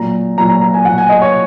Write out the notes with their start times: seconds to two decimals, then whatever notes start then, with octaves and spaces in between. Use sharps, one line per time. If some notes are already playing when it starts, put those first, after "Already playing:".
Already playing: A#2 F#3 A#5
0.37 A#2 F#3 A#5
0.49 A#5
0.61 A#5
0.74 G#5
0.85 A#2 F#3 F#5
0.98 G#5
1.09 D#5
1.22 C#5